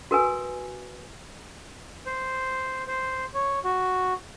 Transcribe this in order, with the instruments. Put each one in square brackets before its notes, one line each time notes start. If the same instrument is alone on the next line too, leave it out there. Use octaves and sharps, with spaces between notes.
[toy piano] F#4 A#4 B4 G#5
[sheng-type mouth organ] C5
C5
C#5
F#4